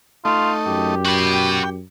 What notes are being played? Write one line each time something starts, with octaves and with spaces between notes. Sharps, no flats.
A3 D#4 F4
F#2 G4
F#4 G5 B5